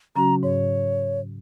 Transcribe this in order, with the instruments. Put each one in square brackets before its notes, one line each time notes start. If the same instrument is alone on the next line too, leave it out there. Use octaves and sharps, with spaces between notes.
[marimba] C#3 F#3 C#4 F#4 [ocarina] A#5
[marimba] G#2 [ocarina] C#5